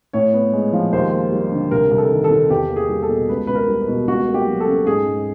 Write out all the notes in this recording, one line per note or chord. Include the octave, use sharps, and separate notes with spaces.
A2 C#5
B3
G#3
F3
D#2 C5
A#3
G3
D3
C2 A#4
C2
A4
D#3
A4
C3
E2 G4
A#3
G#4
G3
A4
B2
C#2 B4
C#2 B4
A#4
G3
B4
B2
C#2 F#4
A#3
G4
F#3
A4
C#3
G#2 G#4
G#2